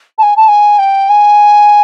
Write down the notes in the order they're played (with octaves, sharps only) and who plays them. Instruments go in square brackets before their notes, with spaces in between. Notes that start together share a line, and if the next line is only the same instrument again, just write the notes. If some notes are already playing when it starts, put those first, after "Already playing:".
[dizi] A5
G#5
A5
G#5
G5
G#5